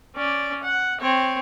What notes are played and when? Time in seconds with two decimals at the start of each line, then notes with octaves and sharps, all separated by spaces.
0.16 C#4 D5
0.63 F#5
1.01 C4 C#5